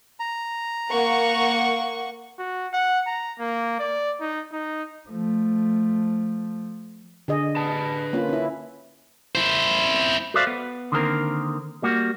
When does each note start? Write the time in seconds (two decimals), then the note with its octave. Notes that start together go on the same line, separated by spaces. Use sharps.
0.20 A#5
0.90 A#3 F#5 C#6
2.38 F#4
2.73 F#5
3.07 A#5
3.39 A#3
3.79 D5
4.21 D#4
4.52 D#4
5.09 F3 A3
7.28 D3 G#4 D#5
7.56 B4 A5
8.13 A#3 C#4 F4
8.29 C#4 E4
9.35 E4 C5
10.34 F#4 A4 C5 D5 E5 F5
10.47 B3
10.92 D3 D#3 A#3 C4 A4 A#4
11.82 G3 A#3 F#4